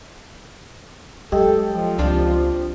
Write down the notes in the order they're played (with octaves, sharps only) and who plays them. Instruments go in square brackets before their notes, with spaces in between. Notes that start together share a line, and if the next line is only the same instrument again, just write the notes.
[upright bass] F#3 G#3 [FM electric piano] G4 D#5 G5 [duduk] A4
[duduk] F3
[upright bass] C#2 [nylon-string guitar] C4 D4 F4